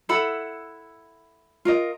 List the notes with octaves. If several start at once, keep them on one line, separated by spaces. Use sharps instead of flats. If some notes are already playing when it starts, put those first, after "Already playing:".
E4 A4 F#5 B5
F4 A#4 D#5